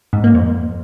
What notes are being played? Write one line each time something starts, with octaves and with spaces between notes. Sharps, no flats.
G#2
A#3
F2